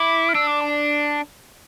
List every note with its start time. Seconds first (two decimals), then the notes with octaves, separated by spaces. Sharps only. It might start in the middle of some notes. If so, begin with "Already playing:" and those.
Already playing: E4 D6
0.29 F6
0.34 D4 E6
0.47 D6
0.61 A5